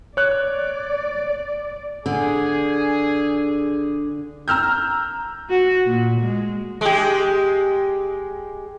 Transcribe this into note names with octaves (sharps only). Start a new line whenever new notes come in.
C#5 D5 F#6
D3 G#4
A#5 E6 F6 G6
F#4
A#2
G#3
G#3 G4